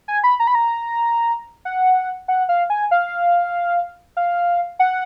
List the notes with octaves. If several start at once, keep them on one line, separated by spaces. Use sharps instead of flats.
G#5
B5
A#5
B5
A#5
F#5
F#5
F5
G#5
F5
F5
F#5